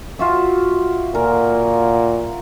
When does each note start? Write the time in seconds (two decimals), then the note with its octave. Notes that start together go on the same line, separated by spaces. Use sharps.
0.19 F4 F#4 E5
1.15 A#2 A#4